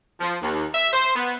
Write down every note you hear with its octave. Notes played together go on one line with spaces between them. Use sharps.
F3
D#2
E5
C5
B3